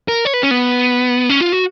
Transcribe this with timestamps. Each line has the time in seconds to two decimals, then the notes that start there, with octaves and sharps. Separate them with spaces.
0.08 A#4
0.25 C#5
0.34 B4
0.43 C#4
0.51 B3
1.29 C#4
1.41 F4
1.52 F#4